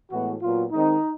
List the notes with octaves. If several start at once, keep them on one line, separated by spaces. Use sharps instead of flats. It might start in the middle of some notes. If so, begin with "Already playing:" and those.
A2 E3 G#3 B3 F#4
A#2 F#3 B3 F4
D#3 G#3 C4 D#4